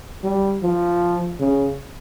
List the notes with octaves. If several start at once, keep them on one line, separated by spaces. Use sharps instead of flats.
G3
F3
C#3